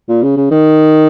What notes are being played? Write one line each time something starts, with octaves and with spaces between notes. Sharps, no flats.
A#2
C#3
C#3
D#3